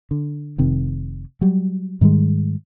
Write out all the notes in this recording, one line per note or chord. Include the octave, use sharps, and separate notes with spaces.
D3
F1 C3 D#3
F#3 G3
G#2 D#3 G3 G#3